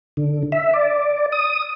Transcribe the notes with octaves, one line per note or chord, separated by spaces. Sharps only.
D3
E5
D5
D#6